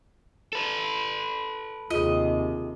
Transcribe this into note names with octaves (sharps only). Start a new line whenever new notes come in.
A4 B4
D#2 C3 F4 G#4 D#5